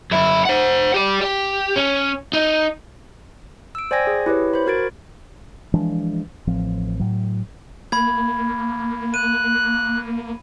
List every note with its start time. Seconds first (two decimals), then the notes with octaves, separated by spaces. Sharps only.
0.11 F#2 E4
0.45 C5 F#5
0.94 G4 D5
1.21 G4
1.76 C#4
2.33 D#4
3.75 E6 D7
3.91 C5 D5 G5 G#5 G#6 A#6
4.07 G#4
4.26 E4 G4 B4 C#5
4.54 C5 B5
4.66 F#4 A#4 G#6 A6 D7
5.74 E3 F3 G#3 D4
6.47 A1 F3 C4
6.99 A2 F#3
7.92 A#3 B5 G#6
9.14 F#6 D#7